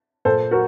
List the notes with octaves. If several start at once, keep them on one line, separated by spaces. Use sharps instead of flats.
A#2 A4 C5
F#4 A#4